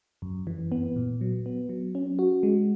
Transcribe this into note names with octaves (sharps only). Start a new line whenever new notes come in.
F#2
E3
B3
A#2
F#3
B3
F#3
C#4
F#4
G#3